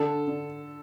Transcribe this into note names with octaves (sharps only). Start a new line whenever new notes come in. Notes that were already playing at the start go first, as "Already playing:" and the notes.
Already playing: D3 A4
D3